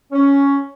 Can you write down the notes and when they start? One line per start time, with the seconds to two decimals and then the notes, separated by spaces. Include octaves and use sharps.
0.10 C#4